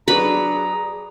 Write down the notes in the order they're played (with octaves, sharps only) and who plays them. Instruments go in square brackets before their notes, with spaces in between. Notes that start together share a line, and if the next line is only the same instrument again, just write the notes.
[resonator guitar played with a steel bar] F#3 D4 [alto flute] G#4 [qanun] B4 B5 [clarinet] A#5